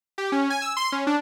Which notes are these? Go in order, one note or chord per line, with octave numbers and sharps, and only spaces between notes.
G4
C#4
G#5
E6
C6
C#4
D4